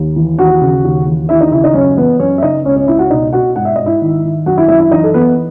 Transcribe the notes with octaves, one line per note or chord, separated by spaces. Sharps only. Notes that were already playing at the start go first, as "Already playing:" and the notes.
Already playing: D#2
E3
D#2 F#4 F#5
C#3
D#2
E3
D#2 E4 E5
D#4 D#5
C#3 E4 E5
D#4 D#5
F#2 C#4 C#5
E3 B3 B4
F#2 C#4 C#5
E5
C#3 D#4 D#5
C#2 C#4 C#5
C#4 C#5
C#2 E4 E5
F#4 F#5
B2 D#4 D#5
B2 F#4 F#5
G#2 F#5
E5
G#2 D#5
E4 E5
D#3
D#3
F#2 F#4 F#5
E4 E5
F#2 E4 E5
E4 E5
E3 D#4 D#5
A4
E3 B3 B4